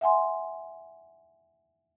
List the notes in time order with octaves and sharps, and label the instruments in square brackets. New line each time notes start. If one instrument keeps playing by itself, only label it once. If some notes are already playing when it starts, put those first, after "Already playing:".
[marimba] E5 F#5 G#5 C6